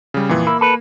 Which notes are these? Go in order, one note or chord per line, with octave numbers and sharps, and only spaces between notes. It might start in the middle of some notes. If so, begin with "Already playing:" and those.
C#3 G3
F2 A#2 E3
A#3 E4
A4 B4